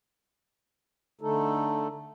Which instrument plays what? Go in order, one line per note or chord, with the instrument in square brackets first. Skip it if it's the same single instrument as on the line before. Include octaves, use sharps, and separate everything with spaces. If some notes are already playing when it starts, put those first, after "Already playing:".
[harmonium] D3 A3 D#4 A4